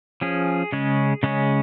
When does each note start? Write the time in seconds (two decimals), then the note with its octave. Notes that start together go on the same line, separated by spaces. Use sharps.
0.21 F3 C#4 G#4
0.72 C#3 G#3 C#4
1.23 C#3 G#3 C#4